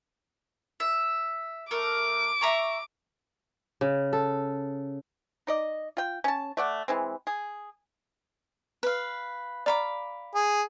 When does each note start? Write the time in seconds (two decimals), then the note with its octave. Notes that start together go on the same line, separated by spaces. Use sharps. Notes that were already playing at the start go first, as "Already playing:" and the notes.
0.80 E5
1.71 A3 A#4 D6
2.41 E5 A#5 C#6
3.81 C#3
4.13 A4
5.47 D#4 D5 D#5
5.97 F4 G5
6.24 C#4 A5
6.57 A3 D5 F#5
6.88 E3 G#3 C4
7.27 G#4
8.83 B4 F5
9.66 D5 F5 A#5 B5 D6
10.35 G#4